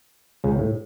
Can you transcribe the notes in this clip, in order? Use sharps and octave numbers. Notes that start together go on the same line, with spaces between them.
C#2 C#3
A2